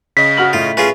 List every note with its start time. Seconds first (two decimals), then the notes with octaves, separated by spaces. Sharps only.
0.17 C#3 D#5 B6
0.37 F#4 F6 F#7
0.53 A2 F4
0.77 C#4 F4 G#4 B4